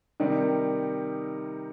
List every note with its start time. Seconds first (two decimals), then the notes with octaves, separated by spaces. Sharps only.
0.20 C3 D#3 G3 D#4